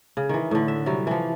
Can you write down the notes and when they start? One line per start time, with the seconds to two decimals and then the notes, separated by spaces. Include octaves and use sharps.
0.17 C#3
0.29 D#3 E3
0.51 A2 D3
0.68 E5
0.86 C3 F#3 G3
1.07 E3 F3